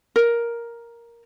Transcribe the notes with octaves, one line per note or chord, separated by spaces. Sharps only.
A#4